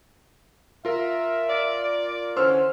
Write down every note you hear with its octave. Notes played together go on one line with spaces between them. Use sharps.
F4 A#4 E5
D5
D3 E3 C#4 C5 C6 E6 F6